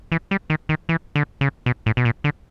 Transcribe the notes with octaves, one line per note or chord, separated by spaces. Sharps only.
E3
G3
D#3
D#3
E3
D3
C#3
B2
A2
B2
A#2
D3